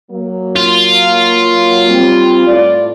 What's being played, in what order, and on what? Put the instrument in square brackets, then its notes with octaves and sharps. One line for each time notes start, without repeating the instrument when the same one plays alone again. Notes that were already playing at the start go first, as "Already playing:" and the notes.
[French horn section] F#3 A#3
[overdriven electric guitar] F4
[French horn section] G3 C4
A2 D5